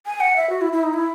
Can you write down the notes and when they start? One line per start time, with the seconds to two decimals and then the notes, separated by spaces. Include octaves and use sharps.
0.06 G#5
0.20 F#5
0.36 E5
0.50 F#4
0.61 E4
0.73 E4
0.83 D#4
0.93 E4